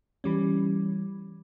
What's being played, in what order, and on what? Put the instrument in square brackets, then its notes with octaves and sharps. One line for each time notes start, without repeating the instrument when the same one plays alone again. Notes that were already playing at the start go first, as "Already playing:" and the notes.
[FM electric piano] E3 G3 C#4